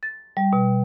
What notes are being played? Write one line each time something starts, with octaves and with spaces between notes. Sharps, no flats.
A6
G3
B2